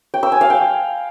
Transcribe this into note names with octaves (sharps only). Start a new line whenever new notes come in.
G5
E6
G#5
F5
G5